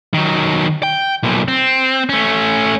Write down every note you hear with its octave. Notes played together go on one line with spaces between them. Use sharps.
D#3 F#3
G5
B1 A#2
C4
A3 C#4